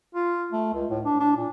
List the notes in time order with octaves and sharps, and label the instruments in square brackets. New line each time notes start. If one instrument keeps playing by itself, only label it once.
[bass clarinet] F4
A3
C#2
A2
D4
D4
A#2